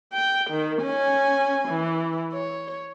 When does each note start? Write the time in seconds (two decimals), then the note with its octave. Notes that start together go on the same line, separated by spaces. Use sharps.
0.13 G5
0.51 D#3
0.82 C#4 G#5
1.69 E3
2.33 C#5